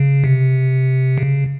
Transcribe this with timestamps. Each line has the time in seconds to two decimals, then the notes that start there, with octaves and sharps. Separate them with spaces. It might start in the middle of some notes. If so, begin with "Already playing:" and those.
Already playing: C#3
0.24 C3
1.18 C#3